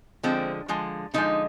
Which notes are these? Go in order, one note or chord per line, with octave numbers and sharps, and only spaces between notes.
D3 F3 G#3 C4
D3 F3 G#3
D3 F3 G#3 D#4